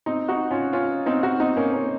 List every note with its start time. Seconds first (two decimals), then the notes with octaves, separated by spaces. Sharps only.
0.06 C4 D#4
0.28 D#4 F#4
0.51 C#4 F4
0.73 C#4 F4
1.06 C4 D#4
1.23 D#4 F#4
1.40 C4 D#4
1.57 A#3 C#4
1.73 A#3 C#4